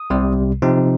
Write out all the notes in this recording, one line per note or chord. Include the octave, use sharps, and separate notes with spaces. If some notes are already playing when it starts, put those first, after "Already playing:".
Already playing: D#6
C2 C3 G3
C3 F3 C4 D#4